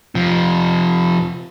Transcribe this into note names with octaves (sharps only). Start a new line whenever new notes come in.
C3 F3